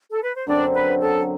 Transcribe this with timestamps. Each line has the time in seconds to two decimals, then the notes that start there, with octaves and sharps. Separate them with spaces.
0.09 A4
0.22 B4
0.34 C5
0.46 F#2 D3 F#3 C4 D4 D5
0.73 B4
1.02 A4